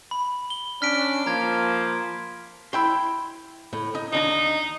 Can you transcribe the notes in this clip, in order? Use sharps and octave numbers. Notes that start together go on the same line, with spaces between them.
B5
G7
C#4 D4 F6 B6 D7
F3 A#3 A#5 G#6
E4 G5 C6
A2
D#4
D#2 D4 D#4 A#5